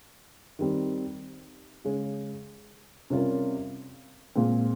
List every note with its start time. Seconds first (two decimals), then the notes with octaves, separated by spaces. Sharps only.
0.59 D#3 G3 C4
1.85 C#3 G#3 C#4
3.10 C3 G3 C#4 F4 A#4
4.35 A#2 G#3 C4